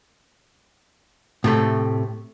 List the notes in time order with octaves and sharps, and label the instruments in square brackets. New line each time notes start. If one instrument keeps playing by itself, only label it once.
[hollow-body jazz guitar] A2 C3 A3